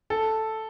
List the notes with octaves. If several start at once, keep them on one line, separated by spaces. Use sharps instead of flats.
A4